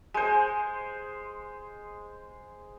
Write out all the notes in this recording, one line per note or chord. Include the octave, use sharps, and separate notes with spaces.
G#3 C5